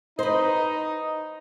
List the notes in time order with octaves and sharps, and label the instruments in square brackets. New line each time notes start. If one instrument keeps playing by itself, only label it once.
[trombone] D#4 [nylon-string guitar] B4 C5 [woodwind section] D#5